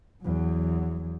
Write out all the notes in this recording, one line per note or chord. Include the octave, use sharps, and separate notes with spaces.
E2 F#3